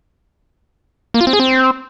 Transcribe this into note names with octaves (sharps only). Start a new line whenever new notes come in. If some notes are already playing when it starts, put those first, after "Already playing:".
A#3
F4
C4
G#4
C4